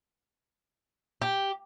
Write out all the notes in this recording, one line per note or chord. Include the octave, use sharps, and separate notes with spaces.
G4